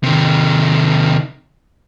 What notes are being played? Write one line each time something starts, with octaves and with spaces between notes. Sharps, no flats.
C3 D#3